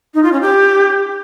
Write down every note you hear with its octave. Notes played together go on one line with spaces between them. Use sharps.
D#4
F4
C#4
G4